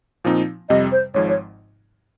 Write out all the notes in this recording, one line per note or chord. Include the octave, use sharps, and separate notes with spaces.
A#2 F3 C4 D#4
F2 C3 G3 D#5
C5
G#1 G#2 F3 C#5
C#5